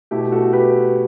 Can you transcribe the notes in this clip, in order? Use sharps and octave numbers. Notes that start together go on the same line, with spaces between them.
B2 A3 E4 G4
F#4 A4
G4 B4